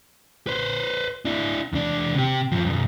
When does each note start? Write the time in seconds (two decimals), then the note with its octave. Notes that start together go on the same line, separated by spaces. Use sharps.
0.47 B4 C5
1.25 D4 E4
1.73 E2 D4
2.15 C3 G4
2.52 F#2 F3
2.65 B1 F#2